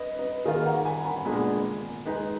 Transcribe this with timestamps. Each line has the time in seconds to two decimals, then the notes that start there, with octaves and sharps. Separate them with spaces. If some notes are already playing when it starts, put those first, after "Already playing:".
Already playing: B4 D#5
0.19 B4 D#5
0.45 D#3 A#3 F4 G#4 B4
0.65 F#5 A#5
0.85 G#5 B5
1.05 G#5 B5
1.25 A#2 G#3 B3 D4 G#5 B5
2.06 G#3 D#4 G#4 B4